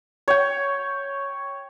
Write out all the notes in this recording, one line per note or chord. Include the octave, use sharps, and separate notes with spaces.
C#5 G5